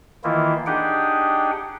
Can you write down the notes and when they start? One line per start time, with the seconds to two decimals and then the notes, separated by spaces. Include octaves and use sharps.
0.24 D#3 E3 A#3 E4 F4
0.66 D4 D#4 G4 G#4 F#5 G5